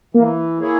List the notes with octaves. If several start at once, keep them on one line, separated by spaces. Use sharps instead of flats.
E3 A#3
A#3 E4 G#4 C#5